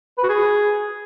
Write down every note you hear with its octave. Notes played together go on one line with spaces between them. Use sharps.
B4
F#4
G#4